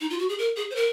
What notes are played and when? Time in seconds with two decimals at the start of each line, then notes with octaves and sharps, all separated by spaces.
0.01 D#4
0.10 F4
0.19 F#4
0.29 G#4
0.39 A#4
0.56 G#4
0.70 C5
0.76 A#4